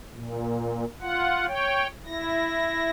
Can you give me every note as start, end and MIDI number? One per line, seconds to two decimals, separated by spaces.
0.13 0.84 46
1.01 1.46 65
1.01 1.46 78
1.48 1.87 73
1.48 1.87 79
2.06 2.91 64
2.06 2.91 94